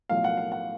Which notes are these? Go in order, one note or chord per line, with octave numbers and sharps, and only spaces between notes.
B1 A2 F3 F5
F#5
F5
F#5